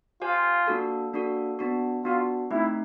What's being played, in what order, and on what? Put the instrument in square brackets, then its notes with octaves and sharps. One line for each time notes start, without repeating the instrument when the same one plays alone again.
[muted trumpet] F4 [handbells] G4 C5 F5 G#5
[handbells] A#3 D4 F#4 A4
A#3 D4 F#4 A4
B3 D4 F#4
[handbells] B3 D4 F#4 [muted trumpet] F4
[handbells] A3 C4 D#4 G4 [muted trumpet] E4